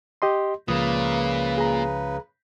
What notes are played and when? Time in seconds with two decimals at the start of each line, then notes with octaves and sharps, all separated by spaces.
0.22 G4 D#5 C6
0.68 C#2 A#2 C#3 F3 B4 D#6
1.58 G#4 A#5